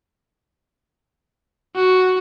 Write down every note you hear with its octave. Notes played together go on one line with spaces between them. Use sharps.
F#4